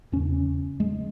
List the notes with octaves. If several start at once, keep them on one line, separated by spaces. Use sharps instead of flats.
E2 C#3 C#4
G#3